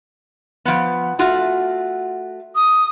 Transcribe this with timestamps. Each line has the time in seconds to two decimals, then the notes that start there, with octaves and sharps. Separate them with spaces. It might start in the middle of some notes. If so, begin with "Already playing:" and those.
0.65 F3 B3
1.19 A3 F4 F#4
2.56 D#6